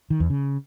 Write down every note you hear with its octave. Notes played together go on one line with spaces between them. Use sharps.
D#3
E2
C#3